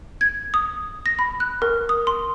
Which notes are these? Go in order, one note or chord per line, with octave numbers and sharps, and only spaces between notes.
G#6
D#6
A#6
B5
F#6
A#4
D#6
C6